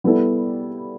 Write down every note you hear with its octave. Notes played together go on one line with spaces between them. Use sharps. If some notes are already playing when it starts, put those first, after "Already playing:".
G3 B3 E4 A4